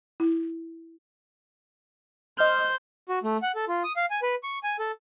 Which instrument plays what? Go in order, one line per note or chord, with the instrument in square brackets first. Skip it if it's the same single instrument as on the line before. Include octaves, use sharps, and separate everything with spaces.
[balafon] E4
[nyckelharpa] C5 [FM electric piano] D#5 F6 [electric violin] G6
[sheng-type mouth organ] F#4
A3
F#5
A4
F4
D#6
F5
G#5
B4
C#6
G#5
A4